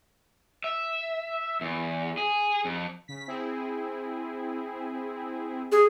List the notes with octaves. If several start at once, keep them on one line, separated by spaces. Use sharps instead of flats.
E5
E2
G#4
F2
C#3 B6
C4 E4 G#4
G#4